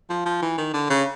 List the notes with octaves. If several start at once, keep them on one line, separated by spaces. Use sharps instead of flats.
F3
F3
E3
D#3
D3
C#3